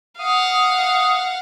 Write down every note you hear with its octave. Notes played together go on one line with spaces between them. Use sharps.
F5 F#5 D#6